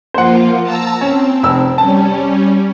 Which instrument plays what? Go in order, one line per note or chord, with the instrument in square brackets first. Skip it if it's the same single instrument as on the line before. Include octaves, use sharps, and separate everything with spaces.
[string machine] F3 A#3 F4 [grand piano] C5 F#5
[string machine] A5 A#5 E6
[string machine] C4 [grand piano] C#4
[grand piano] F1 E6
[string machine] G3 C#4 [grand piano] A5